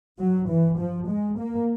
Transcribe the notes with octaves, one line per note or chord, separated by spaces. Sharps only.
G2 F#3
E3
F3
G#3
A#3